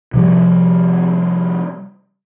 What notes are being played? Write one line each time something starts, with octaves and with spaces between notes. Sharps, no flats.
C3 F3 G3